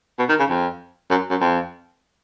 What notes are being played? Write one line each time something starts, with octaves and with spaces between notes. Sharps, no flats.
B2
D#3
C#3
F2
F#2
F#2
F2